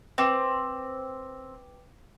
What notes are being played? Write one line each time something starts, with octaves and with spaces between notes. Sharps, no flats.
C4 B4 G5 D6